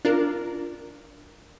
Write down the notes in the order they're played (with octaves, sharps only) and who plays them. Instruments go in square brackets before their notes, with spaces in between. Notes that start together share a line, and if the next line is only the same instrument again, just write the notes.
[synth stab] D4 F4 A#4